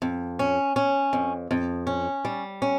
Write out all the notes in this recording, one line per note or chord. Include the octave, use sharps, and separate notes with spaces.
F2
C#4
C#4
F2
F2
C#4
G3
C#4